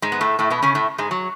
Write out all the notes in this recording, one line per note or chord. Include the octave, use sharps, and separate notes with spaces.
G#2 G#3
B3
A2 A3
A2 A3
B2 B3
C#3 C#4
A2 A3
G#2 G#3
F#3